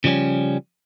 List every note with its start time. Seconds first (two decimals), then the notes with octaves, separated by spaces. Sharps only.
0.04 C#3 F3 G3 C4 C#4